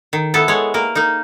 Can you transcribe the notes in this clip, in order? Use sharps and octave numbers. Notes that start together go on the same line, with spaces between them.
D#3
B3 E4 A4
G#3 B3 C#5
A#3 A#4
A#3 D#4